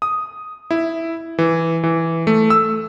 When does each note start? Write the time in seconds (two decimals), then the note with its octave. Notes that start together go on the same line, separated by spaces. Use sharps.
0.02 D#6
0.71 E4
1.38 E3
1.83 E3
2.27 A3
2.50 E6